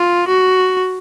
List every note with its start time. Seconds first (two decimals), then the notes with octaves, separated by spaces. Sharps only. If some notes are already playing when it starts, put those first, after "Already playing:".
Already playing: F4
0.28 F#4